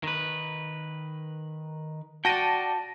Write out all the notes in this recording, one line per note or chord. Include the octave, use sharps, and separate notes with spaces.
D#3 B4
F#4 D5 G5 A5 A#6 D#7